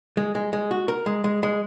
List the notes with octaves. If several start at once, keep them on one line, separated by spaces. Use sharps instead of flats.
G#3
G#3
G#3
F#4
A#4
G#3
G#3
G#3